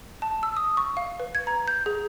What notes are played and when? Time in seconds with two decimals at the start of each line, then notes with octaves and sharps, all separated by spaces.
0.22 A5
0.43 E6
0.57 D#6
0.77 C#6
0.97 F5
1.20 B4
1.35 G#6
1.47 A#5
1.68 G6
1.86 G#4